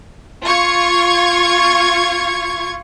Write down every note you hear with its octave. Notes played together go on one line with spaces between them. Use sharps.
F4 C#6 G#6